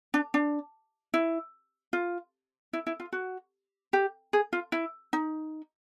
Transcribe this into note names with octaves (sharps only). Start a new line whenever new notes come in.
D4
D4
E4
F4
E4
E4
F4
F#4
G4
G#4
F4
E4
D#4